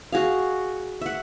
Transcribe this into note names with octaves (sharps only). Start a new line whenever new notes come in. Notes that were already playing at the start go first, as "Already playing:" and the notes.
F#4 G#4 F5
E5 F#5